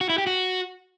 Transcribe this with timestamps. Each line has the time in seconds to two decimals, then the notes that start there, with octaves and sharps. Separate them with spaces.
0.01 F#4
0.09 E4
0.18 G4
0.27 F#4